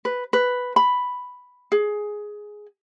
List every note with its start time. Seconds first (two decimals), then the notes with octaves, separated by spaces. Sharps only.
0.05 B4
0.33 B4
0.76 B5
1.72 G#4